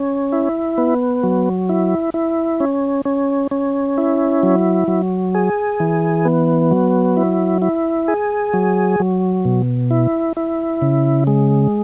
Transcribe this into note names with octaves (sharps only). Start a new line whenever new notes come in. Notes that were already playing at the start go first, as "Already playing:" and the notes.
Already playing: C#4
E4
B3
F#3
E4
E4
C#4
C#4
C#4
E4
F#3
F#3
G#4
E3
B3
F#3
E4
E4
G#4
F#3
F#3
B2
E4
E4
C#3
G#3